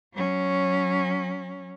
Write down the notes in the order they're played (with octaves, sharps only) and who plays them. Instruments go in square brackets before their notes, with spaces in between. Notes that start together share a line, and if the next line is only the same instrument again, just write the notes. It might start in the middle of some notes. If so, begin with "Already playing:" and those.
[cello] F#3 C#4